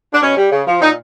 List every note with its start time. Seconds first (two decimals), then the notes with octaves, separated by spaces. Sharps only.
0.14 D4
0.23 B2 C#4
0.37 G3
0.52 C#3
0.67 F3
0.82 A#2 D#4